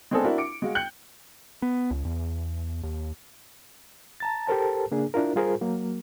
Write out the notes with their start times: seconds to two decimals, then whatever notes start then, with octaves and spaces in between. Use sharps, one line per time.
0.11 G#3 B3 C4 D4 G#4 A4
0.24 D4 E4 F#4 A#4
0.38 D6 C#7 D7
0.62 G#3 F#4 F5
0.75 G5 F#6 G6 C#7 F#7
1.62 B3
1.91 C#2
2.05 E2
2.83 D#2
4.20 A5 A#5 A6
4.47 G4 A4 A#4 C5 A5
4.91 C#3 A#3 D4 G#4
5.14 D4 E4 F4 A#4
5.36 G3 F4 G#4 A#4 C5
5.61 F#3 A#3